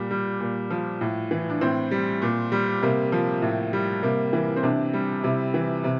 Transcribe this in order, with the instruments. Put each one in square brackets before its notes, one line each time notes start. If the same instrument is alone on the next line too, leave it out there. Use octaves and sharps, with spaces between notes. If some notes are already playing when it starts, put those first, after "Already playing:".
Already playing: [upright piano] A#2 G3
G3
A#2
F3
A2
E3
D4
A2 C4
G3
A#2
G3
C3 A#3
F3
A2
G3
C3 A#3
E3
C4
C3 D4
G3
C3 E4
E3
C3